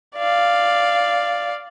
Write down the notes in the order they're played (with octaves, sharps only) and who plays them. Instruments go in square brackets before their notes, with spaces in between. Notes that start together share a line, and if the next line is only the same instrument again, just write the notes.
[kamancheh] D5 F5